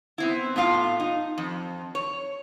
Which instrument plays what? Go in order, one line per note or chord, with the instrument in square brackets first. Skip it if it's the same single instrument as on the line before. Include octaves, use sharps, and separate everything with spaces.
[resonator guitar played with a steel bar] B3 C4 E4
A2 B3 F4 F5
D#4
F2
C#5